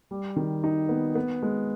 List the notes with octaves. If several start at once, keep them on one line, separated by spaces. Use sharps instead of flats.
G3
D#3
D#4
B3
B3
G#3